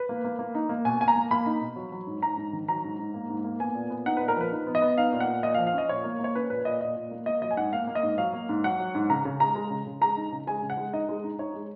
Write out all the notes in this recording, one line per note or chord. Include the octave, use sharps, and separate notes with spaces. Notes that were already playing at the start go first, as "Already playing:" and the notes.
Already playing: B4
A#3
A#3
A#3
D#4
A#3
B2 G#5
A#3 G#5
A#5
A#3
A#3 B5
D#4
B2
F#3
F#3
G#2
G#2 A#5
G#2
D#3
F#3 A#5
G#2
G#2
A#3
G#2
A#3
B3 G#5
A#2
B3
D#4 F#5
B4
A#2
A#4
F3 B4
D#4
B3
D#5
B3
D#4 F5
A#2
F#5
A#2
A#2 D#5
F5
F3
F5
C#4 D#5
A#2 C#5
A#3
A#3
C#5
C#4 B4
A#2 B4
A#2 D#5
A#2 D#5
A#2
A#3
A#3 D#5
F#3 D#5
G#5
G#2 F#5
A#3 F5
A#3
D#5
G#2
F#3 F5
A#3
G#2
F#3 F#5
F#3
G#2
C#3 A#5
C#3
G#3 A#5
G#3
C#3
C#3
G#3 A#5
D#4
C#3
G#3 G#5
C#3
F#5
G#3
D#4 D#5
G#3
D#4
D#4 C#5
G#3